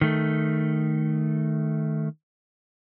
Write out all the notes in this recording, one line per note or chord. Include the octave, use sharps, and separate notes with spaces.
D#3 A3